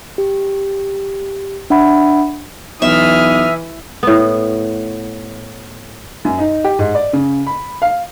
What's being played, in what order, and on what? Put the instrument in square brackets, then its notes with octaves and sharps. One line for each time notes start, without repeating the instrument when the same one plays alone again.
[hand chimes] G4
D4 E5 F#5 B5
[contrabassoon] B1 [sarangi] E3 [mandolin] E5 [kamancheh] D#6 F6
[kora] A2 B3
[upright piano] F#2
D#4
G4
G#2
D5
C#3
B5
F5